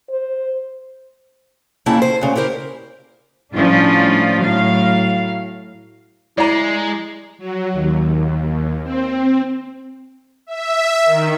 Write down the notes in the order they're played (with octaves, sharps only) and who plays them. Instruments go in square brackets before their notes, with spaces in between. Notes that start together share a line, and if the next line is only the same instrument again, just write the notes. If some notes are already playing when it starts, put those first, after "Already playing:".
[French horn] C5
[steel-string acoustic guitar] F2 C#3 A#3 E4 G5 A5
C5
D2 C#3
E4 G4 A#4 C5
[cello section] A2 F3 G3 C#4 D4 F4
A2 F#3 F5
[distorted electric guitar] G#3 [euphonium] E4 [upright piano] D5 A#5
[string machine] F#3
D#2
C4
[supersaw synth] E5
D#3